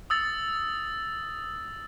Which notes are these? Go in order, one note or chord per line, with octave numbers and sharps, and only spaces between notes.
D#6 E6 A6